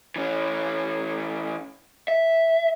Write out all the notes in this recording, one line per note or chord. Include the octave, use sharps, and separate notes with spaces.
E3 C#4
E5